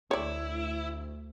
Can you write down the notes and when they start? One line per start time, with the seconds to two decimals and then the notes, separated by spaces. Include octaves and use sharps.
0.11 D2 E4 C#5 D5